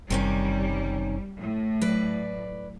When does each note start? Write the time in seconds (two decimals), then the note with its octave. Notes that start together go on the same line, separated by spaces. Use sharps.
0.10 F#1 C3 D#3 G3 C#4
1.39 A2
1.82 F#3 B4 D5